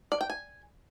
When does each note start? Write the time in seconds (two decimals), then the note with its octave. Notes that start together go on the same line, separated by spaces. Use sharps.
0.12 D5
0.21 G5
0.30 G#5